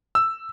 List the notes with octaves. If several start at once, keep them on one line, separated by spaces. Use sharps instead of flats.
E6